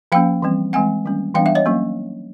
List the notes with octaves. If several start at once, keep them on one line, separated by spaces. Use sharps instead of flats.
F3 A#3 C#4 F5 G5
E3 G3 C4
E3 G#3 C4 F#5 G#5
D#3 G3 A#3 C#4
E3 G3 B3 D4 F5 G5
E5 F#5
C#5 D#5
F#3 A#3 C#4